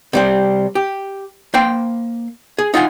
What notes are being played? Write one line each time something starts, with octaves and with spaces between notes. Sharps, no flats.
C3 G3 C4
G4
A#3 C5 G5 C6
G#4
D#4 F4 F#5 G#5